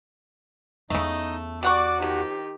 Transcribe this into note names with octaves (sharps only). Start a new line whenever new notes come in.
E2 C#3 A3 B3 D#4 D#5
G3 F#4 D5 F#5 C#6 D6
D#3 F3 G4